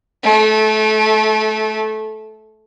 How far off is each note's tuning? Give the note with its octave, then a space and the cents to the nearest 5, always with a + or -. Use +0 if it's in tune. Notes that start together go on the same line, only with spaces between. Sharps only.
A3 -25